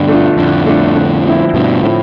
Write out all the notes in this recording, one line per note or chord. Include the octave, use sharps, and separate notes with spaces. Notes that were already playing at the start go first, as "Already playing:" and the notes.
Already playing: G2 B2 D3
A3 D4 F4
F2 A2 D3
A3 D4 F4
D3
F3 C4 E4
G2 B2 D3
A2 F3 C4 E4